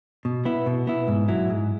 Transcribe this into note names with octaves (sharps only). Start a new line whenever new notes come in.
B2
B3 E4
B2
B3 E4
G#2
F#3 E4
G#2